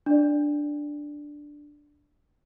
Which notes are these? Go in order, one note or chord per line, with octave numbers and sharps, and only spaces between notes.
D4 D5